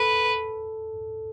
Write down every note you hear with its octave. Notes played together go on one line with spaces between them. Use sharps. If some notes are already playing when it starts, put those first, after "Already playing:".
Already playing: A4 B4